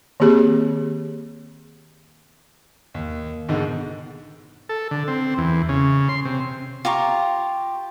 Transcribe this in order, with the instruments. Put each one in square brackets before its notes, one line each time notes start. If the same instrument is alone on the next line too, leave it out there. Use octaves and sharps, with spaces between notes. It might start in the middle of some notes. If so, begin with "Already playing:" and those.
[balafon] D#3 A#3 C4 G4 G#4
[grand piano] D#2
G#2 B2 D3 D#3 G#3
[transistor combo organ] A4
D3
C4
E2
C#3
C6
C3
[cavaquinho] F4 G4 A#5 C#6